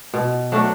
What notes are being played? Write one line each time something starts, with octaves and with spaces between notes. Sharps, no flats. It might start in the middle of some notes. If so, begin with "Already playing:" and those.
B2
F#3 A3 D4